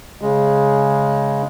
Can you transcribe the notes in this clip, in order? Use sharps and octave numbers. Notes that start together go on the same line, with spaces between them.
C#3 G#3